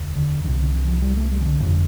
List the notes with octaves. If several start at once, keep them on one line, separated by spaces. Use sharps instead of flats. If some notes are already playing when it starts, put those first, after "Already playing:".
Already playing: E1 D2
D3
C2 C3 E3
D3
E3
F3
G3
A3
G3
E3
D3
G1 F2 D3 E3